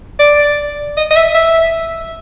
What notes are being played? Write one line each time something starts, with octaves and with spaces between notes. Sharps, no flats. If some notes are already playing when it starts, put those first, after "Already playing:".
D5
D#5
D#5
E5
E5